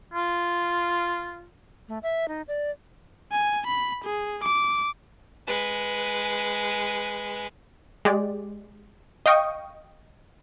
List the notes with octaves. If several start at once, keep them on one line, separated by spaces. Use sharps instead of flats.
F4
A3
E5
D#4
D5
G#5
B5
G#4
D6
G#3 B4
G#3 G4 D5
D#5 F5 G5 C#6 D#6